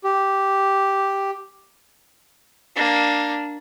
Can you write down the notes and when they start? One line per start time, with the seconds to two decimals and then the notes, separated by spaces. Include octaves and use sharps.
0.04 G4
2.76 A#3 D4